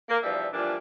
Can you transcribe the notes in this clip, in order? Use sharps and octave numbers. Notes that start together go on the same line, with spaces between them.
A#3
B2 E3 F3 G3 D4 E5
E3 F3 G3 A#3 D4